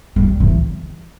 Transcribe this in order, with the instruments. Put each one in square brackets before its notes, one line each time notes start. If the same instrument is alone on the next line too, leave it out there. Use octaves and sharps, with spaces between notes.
[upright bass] G3
E3